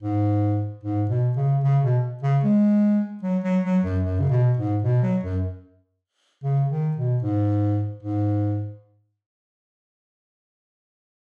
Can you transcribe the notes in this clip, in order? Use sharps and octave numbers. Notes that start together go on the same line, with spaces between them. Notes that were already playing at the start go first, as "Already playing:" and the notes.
G#2
G#2
B2
C#3
C#3
B2
C#3
G#3
F#3
F#3
F#3
F#2
F#2
C#3
B2
G#2
B2
F#3
F#2
C#3
D#3
B2
G#2
G#2